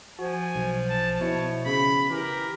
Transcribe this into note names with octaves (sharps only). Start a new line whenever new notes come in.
F3 F#4 G#5
B1
A5
B2 E4 C#5
C#3 B5
E3 G4 A#4